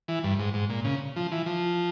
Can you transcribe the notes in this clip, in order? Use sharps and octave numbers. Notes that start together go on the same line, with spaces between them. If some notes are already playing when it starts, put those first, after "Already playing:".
E3
G2
G#2
G#2
A#2
C#3
F3
E3
F3